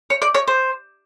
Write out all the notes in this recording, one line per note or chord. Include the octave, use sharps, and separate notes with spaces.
C#5
D5
C#5
C5